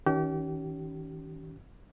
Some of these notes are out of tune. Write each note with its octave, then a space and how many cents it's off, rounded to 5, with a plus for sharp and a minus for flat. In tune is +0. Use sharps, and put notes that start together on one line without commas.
D#3 +35 C#4 +30 G4 -35